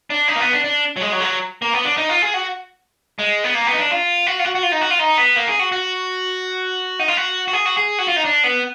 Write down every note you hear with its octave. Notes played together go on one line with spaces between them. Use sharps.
D4
D#4
A#3
B3
D4
D4
F#3
G#3
F#3
G#3
F#3
A#3
B3
D4
D#4
F4
G#4
F#4
G#3
B3
A#3
B3
D#4
D4
F4
F#4
F4
F#4
F#4
F4
D#4
F#4
F4
D#4
B3
A#3
G#4
F#4
F#4
D#4
F4
F#4
F#4
G#4
F#4
G#4
F#4
F4
D#4
D4
B3